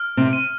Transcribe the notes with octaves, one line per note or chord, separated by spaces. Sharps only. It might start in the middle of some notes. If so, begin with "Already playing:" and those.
Already playing: F6
C3 C4
D#7